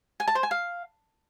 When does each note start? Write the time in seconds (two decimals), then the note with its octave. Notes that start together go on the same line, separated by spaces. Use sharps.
0.20 G#5
0.28 A5
0.35 C5
0.43 G#5
0.51 F5